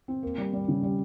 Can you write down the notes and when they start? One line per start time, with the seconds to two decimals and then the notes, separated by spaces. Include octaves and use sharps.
0.08 C4
0.23 A#3
0.38 G3
0.53 G3
0.68 C#3
0.83 G3